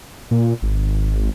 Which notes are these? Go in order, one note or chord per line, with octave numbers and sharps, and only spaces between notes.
A#2
G#1